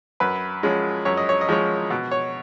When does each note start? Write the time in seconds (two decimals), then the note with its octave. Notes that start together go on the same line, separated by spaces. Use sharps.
0.20 F#2 B4
0.63 F3 G#3 C#4
1.05 F#2 C#5
1.17 D#5
1.29 C#5
1.41 D#5
1.49 F3 G#3 C#4 C#5
1.90 B2
2.11 C#5